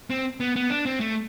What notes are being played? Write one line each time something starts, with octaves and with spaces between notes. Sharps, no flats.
C4
B3
B3
D4
C4
A3